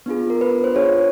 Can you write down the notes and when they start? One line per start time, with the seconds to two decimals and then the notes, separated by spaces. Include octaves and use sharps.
0.06 B3 D4 F4 G#4
0.30 A#4
0.41 B4
0.64 C5
0.75 D4 F4 G#4 C#5